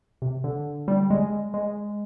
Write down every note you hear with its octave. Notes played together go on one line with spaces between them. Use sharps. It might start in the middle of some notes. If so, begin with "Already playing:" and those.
C3
D3
G3
G#3
G#3